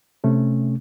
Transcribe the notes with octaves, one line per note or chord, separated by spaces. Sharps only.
C3 A3 C#4